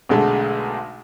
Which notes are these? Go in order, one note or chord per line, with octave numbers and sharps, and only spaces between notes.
B1 D3 G#3 A3